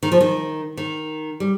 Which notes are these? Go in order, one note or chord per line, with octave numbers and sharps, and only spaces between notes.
D#3
F3
D#3
D#3
G3